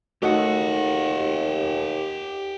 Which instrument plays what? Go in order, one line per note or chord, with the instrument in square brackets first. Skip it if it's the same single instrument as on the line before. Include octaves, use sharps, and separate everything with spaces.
[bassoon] D#2 [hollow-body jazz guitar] A3 D#4 F#4 [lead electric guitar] G4 F#5